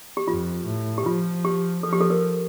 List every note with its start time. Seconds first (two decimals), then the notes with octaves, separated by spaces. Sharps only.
0.17 G4
0.27 F2 F4
0.66 A2
0.98 G4
1.06 F3 F4
1.45 G4
1.83 F3 A4
1.93 G4
2.01 A4
2.10 A#4